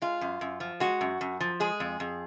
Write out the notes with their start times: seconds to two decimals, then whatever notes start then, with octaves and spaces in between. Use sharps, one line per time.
0.02 G#3 F4
0.21 F#2
0.41 F#2
0.60 F3
0.80 G#3 F#4
1.01 F#2
1.21 F#2
1.41 F3
1.60 G#3 G#4
1.80 F2
2.00 F2